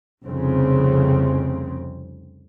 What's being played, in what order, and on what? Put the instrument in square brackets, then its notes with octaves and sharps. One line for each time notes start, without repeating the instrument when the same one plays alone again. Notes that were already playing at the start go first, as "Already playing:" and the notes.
[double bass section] F1 C2 F2 C#3 C4